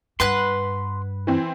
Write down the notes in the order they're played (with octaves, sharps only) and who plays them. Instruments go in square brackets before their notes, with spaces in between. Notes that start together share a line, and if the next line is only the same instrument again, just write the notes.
[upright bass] G2 [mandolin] B4 F#5 F#6 [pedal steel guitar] C6
[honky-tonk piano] E3 C4